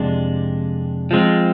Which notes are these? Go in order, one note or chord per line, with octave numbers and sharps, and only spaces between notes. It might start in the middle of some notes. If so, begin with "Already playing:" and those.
Already playing: F2 C3 G#3 D4
F3 G#3 C4